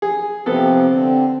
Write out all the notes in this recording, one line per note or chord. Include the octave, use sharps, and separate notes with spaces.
G#4
C3 F3 B3 C4 A4
D3 C4